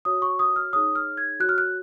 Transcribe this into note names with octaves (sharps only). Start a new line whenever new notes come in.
F#4 C#5 D#6
C#6
D#6
F6
D#4 G#4 C#5 D#6
F6
G#6
F#4 C#5 F#6
F6
F#6